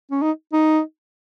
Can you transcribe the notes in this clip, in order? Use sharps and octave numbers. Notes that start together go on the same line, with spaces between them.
C#4
D#4
D#4